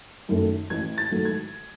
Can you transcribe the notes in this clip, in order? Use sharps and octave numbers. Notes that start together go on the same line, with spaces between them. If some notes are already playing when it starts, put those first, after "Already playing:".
F#2 D#3 A3
A1 G#6
A6
G#2 D#3 F#3 A3
G#6